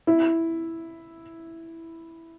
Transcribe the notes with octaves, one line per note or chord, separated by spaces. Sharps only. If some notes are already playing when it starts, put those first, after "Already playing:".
E4